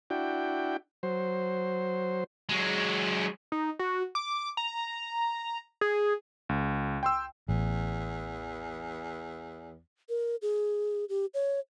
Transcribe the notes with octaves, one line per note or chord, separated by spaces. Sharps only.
D4 E4 F#4 G5
F#3 C5
F#3 G#3
D#4
F#4
D6
A#5
G#4
C#2
G5 C6 E6
A1 E2
A#4
G#4
G4
C#5